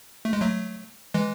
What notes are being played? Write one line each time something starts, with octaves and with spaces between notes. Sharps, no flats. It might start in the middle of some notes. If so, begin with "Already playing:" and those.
A3
G#3
F#3 A3
E3 G#3